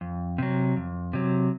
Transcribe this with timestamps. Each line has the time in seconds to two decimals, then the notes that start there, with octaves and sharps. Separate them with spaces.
0.01 F2
0.38 C3 F#3
0.76 F2
1.13 C3 F#3